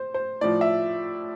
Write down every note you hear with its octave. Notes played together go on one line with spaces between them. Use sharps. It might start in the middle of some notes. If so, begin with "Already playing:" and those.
Already playing: C5
C5
A2 F3 D5
E5